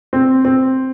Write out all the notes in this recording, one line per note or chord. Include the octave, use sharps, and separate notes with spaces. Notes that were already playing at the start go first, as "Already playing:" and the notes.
C4
C4